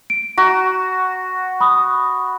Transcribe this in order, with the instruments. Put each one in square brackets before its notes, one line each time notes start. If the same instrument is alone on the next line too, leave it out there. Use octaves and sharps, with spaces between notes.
[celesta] D7
[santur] F#4 [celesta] A#5
[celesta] B5 D#6